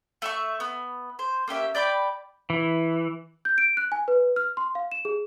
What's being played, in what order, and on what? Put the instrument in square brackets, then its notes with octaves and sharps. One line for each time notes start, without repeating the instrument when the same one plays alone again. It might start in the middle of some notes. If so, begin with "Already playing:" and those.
[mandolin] A3 E5 C#6
B3
C5
A#3 C#4 G4 E5
D5 G5 B5 D6
[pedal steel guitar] E3
[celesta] G6
D7
F#6
G#5
B4
F6
C6
F5
E7
G#4